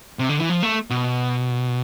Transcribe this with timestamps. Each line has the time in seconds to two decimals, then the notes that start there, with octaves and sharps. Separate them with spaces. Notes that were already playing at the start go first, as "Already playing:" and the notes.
0.19 C3
0.29 D3
0.39 E3
0.49 F3
0.63 A3
0.90 B2